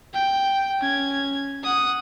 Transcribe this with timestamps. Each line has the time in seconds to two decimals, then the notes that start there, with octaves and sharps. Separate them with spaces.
0.14 G5
0.80 C#4 G#6
1.64 F#5 D#6